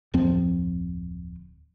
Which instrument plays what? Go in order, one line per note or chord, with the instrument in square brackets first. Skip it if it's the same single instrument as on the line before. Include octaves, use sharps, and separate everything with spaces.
[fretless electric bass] D1 F2 F3 C4